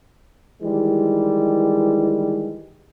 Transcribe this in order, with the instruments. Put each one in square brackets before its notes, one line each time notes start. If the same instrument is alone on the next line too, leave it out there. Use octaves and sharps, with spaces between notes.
[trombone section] D#3 E3 G3 G#3